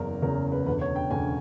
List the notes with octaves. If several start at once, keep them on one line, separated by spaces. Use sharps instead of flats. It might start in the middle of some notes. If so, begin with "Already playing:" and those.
Already playing: F#1 E2 C#3 A#4
F#1 E2 C#3 A#4
B4
E1 D2 C#3 B4
C#5
G5
E1 D2 C#3 G#5